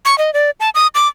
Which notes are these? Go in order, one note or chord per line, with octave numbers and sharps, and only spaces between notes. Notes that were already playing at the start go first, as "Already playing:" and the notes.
C#6
D#5
D5
A5
D#6
D6